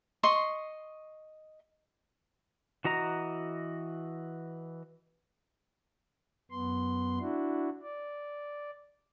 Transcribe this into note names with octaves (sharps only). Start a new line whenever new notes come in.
D#5 C6 C#6
E3 F#4 D#5 A#5
F#2 B3 C6
D4 E4 F#4
D5